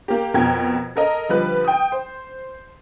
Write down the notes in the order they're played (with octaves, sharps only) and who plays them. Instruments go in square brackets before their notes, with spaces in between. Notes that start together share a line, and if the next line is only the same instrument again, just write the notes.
[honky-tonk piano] A#3 G4
F2 B2 A#4 G5 G#6
A4 A#4 D#5
D3 F3 G3 B4
G5 D#6
C5